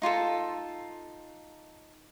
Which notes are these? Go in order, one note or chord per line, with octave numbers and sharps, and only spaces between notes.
D#4 F4 G4 A4